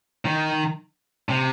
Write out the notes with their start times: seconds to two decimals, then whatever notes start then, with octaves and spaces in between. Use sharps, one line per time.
0.25 D#3
1.29 C3